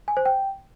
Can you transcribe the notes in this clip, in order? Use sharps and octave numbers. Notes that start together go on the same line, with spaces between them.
G#5
C5
G5